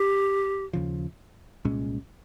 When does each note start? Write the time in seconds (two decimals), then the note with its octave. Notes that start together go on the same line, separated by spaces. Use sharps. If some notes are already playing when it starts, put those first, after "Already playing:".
Already playing: G4
0.73 D#2 C#3 F3
1.65 C2 A#2 G#3 C#4